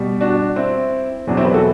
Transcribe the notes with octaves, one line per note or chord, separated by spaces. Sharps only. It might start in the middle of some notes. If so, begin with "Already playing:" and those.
Already playing: B2 G3
D4 F#4
C4 E4
E2 B2 F#3 D4
C4 E4
G4 B4
F#4 A4